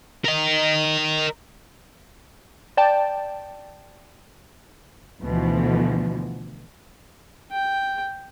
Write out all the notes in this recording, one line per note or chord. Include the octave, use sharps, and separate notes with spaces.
A#4 D#5
D5 G5 A5
D2 B2 E3 F3
G5